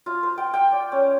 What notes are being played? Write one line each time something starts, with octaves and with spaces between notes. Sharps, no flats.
F4
C5
G5
G5
D5
C#4